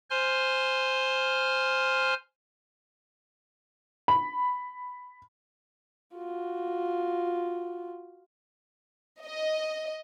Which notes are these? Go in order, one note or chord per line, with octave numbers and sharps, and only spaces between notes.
C5 G#5 C6 F6
B5
F4 F#4
D#5